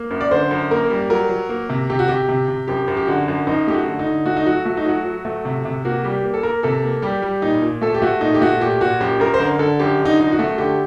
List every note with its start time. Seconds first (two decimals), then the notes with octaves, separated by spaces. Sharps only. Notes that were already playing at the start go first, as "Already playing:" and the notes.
Already playing: A#3
0.11 F#2
0.21 D5
0.31 D3 C5
0.51 F#2
0.71 A#3 A#4
0.90 G3
1.10 F#3 A#4
1.29 F#3
1.49 A#3
1.69 C3
1.90 C3 G4
1.99 F#4
2.08 C3 G4
2.29 C3
2.48 C3
2.68 F#2 G4
2.88 F#2
2.97 G4
3.07 D3 F#4
3.28 F#2
3.47 F#2 D#4
3.67 A3 G4
3.74 F#4
3.87 D3
3.99 D#4
4.06 D3
4.26 A3 F#4
4.37 D#4
4.45 F#3 F#4
4.65 A3 F#4
4.77 D#4
4.85 F#3 F#4
5.05 F#3
5.25 A3
5.45 C3
5.65 C3
5.85 A#3 F#4
6.04 G3 G4
6.23 A#3
6.34 A4
6.43 A#3 A#4
6.63 C3 A4
6.84 A#3
7.02 G3 G4
7.22 G3
7.42 A#2 D#4
7.62 A#2
7.82 A3 A4
7.94 G4
8.02 A3 F#4
8.21 A#2 D#4
8.34 G4
8.41 A3 F#4
8.61 A#2 G4
8.81 A#2 F#4
9.00 F#2 G4
9.20 F#2 A#4
9.34 C5
9.39 D3 A#4
9.59 D3 A4
9.79 F#2 G4
10.00 D3
10.05 D#4
10.19 F#2 D#4
10.32 F#4
10.39 A3
10.58 D3 G4